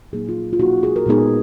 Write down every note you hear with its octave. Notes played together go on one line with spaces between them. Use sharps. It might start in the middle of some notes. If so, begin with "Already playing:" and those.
A#2 F#3 A#3 D#4 G#4
F4
F4
B2 A#3 D#4 F#4
G#4
A#4
A#2 G#3 B3 D#4 G#4